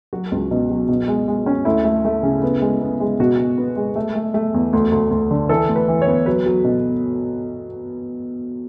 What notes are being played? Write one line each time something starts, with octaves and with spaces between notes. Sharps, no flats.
F#3 F#4
C#2
B2
F#3
B2
G#3
G#3
C#4
D2 E4
A3
A3
C#3
B3
G#3
B3
G#3
B2 F#4
B2
B3
G#3
A3
A3
A3
E2
D2
D2
D2
D3
E3 A4
D2
B4
E3
C#5
B3
F#3 B4
F#3
B2